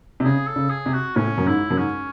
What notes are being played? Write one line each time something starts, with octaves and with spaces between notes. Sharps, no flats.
C3
C#3 G#4
A4
C#3
G#4
C3
F#4
A2 C#4
F#2
G#2 E4
F#2
G#2 C#4